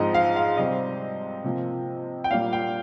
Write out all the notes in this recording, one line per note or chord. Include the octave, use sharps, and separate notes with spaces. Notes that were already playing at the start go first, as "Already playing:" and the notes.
Already playing: G#2 F3 G#3 C4 D#5
F5
F5
C3 G3 C4 D#5
C3 F3 A#3
G5
A#2 G3 A#3 F5
G5